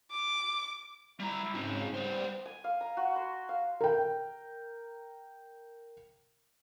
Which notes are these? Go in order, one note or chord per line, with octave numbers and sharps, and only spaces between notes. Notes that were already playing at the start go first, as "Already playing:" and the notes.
D6
G3 E4 A#5
G#2 C#3 C4 D#4
G3 B3 C5
G#5
F5
A#5
F#4
C6
F5
A#4 G5